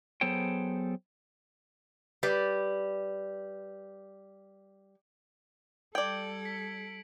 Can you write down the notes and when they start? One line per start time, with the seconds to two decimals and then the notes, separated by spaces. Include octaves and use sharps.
0.21 F#3 B3 G#4 A4 C5 G5
2.23 G3 B4 D5
5.95 G3 A4 D5 G5 G#6 D7 F#7
6.45 B6 C#7